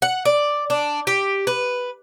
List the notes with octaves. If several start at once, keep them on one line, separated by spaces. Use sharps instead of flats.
F#5
D5
D4
G4
B4